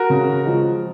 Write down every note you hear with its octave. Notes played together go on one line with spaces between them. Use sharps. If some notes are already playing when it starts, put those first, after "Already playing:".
Already playing: F#4 A#4
C#3
F3 G#3